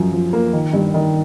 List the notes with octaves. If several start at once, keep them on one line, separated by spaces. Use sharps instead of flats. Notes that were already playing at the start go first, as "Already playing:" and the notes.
Already playing: F#2 F3
F3
A#3
D#3
G2
D#3